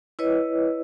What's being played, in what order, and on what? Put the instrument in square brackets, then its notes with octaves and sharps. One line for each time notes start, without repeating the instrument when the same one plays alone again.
[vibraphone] E4 B4 C#5 D#5